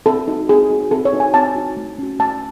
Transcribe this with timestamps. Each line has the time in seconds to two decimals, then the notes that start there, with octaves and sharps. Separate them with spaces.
0.06 C4 A4
0.28 D#4 F#4
0.49 C4 G#4
0.70 D#4 F#4
0.91 C4 A4
1.05 C#5
1.13 D#4 F#4
1.20 G#5
1.34 C4 A5
1.55 D#4 F#4
1.77 A3
1.98 C#4 F#4
2.19 A3 A5